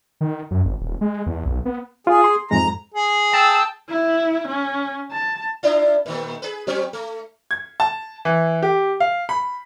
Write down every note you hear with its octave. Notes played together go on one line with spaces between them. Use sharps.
D#3
F#2
G#1
D#1
G#3
E2
B1
B3
F4 G#4
C6
F2 G#2 G#3 A#5
G#4
G5 A5 E6
E4
C#4
A5
D4 E4 F4
A#2 D#3 A3
G#4 B4
F#3 C4 C#4
A3
G#6
A5
E3
G4
F5
B5